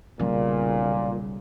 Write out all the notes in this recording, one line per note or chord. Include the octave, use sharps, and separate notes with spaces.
B1 A#2 C#3 G3 C#4